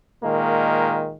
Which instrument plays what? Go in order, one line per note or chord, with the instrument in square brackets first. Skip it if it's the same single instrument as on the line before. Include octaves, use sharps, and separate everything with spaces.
[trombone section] A#2 D#3 G#3 A#3